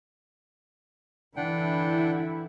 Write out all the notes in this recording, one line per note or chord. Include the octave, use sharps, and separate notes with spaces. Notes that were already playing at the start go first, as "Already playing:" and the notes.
D3 E3 D4 E4 F#5 G5